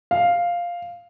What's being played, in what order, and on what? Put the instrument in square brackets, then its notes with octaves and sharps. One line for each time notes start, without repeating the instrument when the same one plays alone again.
[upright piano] F5